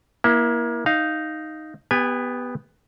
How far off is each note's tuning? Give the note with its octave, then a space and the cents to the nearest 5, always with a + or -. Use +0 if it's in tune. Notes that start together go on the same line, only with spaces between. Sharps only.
A#3 +30 E4 +0
D#4 +0 F5 +0
B3 +0 G4 +20 G#5 -20